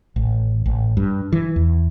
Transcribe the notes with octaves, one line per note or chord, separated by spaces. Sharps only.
A1
A1
G2
E3
E2